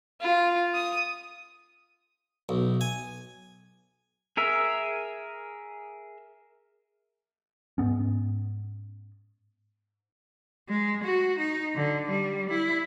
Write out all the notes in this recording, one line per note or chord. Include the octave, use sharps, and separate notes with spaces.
F4
D#6
B1
G#5
G#4 A#4 E5
G#2 B3 C#4
G#3
F#4
D#4
D3
G3
E4